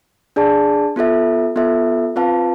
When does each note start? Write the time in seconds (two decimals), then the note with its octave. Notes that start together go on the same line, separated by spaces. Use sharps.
0.36 D4 G#4 D5 A5
0.96 B3 F4 A4 E5
1.56 B3 F4 A4 E5
2.16 C4 F4 B4 F5 A5